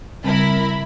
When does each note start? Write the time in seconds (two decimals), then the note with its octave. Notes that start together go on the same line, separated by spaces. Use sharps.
0.24 C#3 G3 C4 E4 A#4 B5